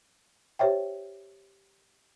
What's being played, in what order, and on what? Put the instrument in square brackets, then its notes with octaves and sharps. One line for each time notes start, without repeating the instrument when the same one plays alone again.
[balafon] G4 C5 C#5 E5 G5